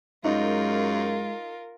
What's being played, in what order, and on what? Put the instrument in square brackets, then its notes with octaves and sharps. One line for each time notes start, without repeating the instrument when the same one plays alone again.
[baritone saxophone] F#2 [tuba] G#3 [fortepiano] D#4 [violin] F4 A#4